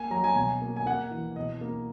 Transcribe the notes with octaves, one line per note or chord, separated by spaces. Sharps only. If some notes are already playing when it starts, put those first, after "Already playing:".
Already playing: A#3 G#5
F#3 A#5
G#5
B2 G#5
A#3
G#5
A#3 F#5
E3
B2 D#5
A#3